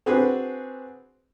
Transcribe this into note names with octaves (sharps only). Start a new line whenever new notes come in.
C4 D4 F#4 G#4 B4